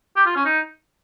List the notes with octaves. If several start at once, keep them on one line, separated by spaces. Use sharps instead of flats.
G4
F4
C#4
D#4